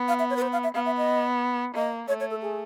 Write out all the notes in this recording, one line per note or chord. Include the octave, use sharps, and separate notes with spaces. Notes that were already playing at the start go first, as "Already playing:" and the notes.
Already playing: B3
F5
E5
C#5
B4
C5
F5
E5
B3 F5
E5
D#5
A#3 D#5
A3 C#5
C#5
A4
G#4